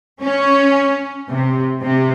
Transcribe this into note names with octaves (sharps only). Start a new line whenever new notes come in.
C#4
C3
C3